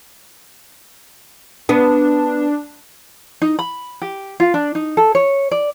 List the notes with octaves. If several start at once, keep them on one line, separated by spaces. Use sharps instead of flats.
B3 D4
D#4
B5
G4
F4
D4
D#4
A4
C#5
D5